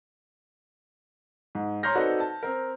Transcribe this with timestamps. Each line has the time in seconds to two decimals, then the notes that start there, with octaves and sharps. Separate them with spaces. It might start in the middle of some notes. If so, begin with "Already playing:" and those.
1.55 G#2
1.83 C#5 A#5 C6 F6 G6 A#6
1.95 C4 D#4 F#4 A4 B4 D5
2.20 A5
2.43 C4 A#4